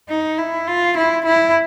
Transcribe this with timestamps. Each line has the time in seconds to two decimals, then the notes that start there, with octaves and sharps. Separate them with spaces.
0.08 D#4
0.38 E4
0.67 F4
0.97 E4
1.25 E4